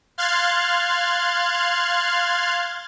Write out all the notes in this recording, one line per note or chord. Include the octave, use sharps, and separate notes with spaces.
F5 C6 F6 F#6 G#6 A6